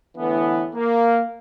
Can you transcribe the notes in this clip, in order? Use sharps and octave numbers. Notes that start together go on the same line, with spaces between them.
A2 D3 E3 B3
A#3